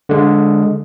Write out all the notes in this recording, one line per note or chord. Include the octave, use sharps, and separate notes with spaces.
D3 G#3